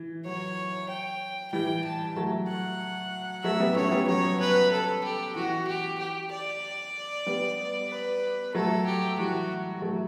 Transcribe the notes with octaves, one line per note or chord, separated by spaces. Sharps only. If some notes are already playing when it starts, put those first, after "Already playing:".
Already playing: E3
F#3 C#5
G5
E3 G3 G5
A5
F#3 A3
F#5
F#3 A3 E5
G3 B3
A3 C#4 C#5
G3 B3
F#3 C#5
B4
A4
G4
E3 F#4
G4
G4
D5
G3 B3
B4
F#3 A3 A4
G4
E3 G3 F#4
F#3 A3